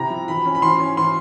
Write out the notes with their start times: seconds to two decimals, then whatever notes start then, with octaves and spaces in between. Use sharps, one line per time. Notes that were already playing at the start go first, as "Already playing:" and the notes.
Already playing: C3 E4 A#5
0.10 F3
0.28 E3 B5
0.45 C#4
0.55 B5
0.62 E3 C6
0.80 C#4
0.97 E3 C6